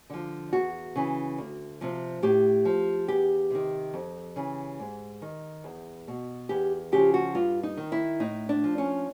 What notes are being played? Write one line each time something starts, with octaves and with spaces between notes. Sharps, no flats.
D3 F3
E2 F#4
C#3 E3
D2
C3 F3
A2 G4
F3
E2 G4
C3 D#3
F2
C#3 E3
G#2
D#3
E2
B2
E2 G4
C#3 F3 G4
F#4
G2 F4
D#4
D#3
E4
A2 D#4
D4
F3
C#4